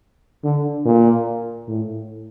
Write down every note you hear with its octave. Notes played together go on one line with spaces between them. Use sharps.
D3
A#2
A2